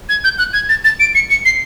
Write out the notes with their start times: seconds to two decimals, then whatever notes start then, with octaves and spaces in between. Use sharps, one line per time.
0.09 G#6
0.24 G6
0.38 F#6
0.53 G#6
0.69 A6
0.84 A6
1.00 D7
1.15 C#7
1.30 C#7
1.45 C7